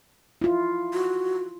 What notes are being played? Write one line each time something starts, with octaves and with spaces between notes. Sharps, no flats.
E4 F4
F#4